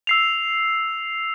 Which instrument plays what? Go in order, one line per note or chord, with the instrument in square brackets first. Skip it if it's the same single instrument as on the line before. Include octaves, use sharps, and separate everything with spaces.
[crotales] E6 C7 F7